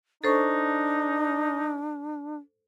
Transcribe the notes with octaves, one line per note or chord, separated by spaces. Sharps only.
D4 D#4 A4 C5 C#6